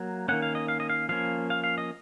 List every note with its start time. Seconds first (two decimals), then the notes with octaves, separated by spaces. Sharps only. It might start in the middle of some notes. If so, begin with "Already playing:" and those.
Already playing: F#3 A#3
0.29 D#3 A#3 C#4 F#5
0.42 F5
0.55 D#5
0.68 F5
0.80 D#5
0.89 F5
1.09 F3 A#3 C#4 F5
1.50 F5
1.64 F5
1.78 D#5